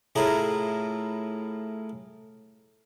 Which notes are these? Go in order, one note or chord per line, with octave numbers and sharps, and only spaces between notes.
A2 E4 F4 G#4 A#4